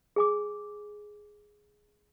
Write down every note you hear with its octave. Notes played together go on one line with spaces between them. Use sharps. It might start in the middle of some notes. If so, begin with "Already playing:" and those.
G#4 G#5 D6